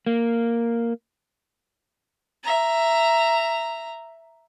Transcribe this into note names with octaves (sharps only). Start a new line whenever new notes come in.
A#3
E5 A#5